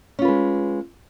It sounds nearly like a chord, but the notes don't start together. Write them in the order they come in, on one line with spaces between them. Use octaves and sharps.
C#4 F4 B4 G#3